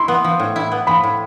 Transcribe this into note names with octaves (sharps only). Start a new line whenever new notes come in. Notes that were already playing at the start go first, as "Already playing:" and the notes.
Already playing: E4 C6
B3
F3
A2
E4
B3
F3 B5
A2